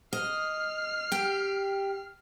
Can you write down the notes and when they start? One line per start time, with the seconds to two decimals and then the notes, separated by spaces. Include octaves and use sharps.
0.13 D#5 F6 C7
1.12 G4 G5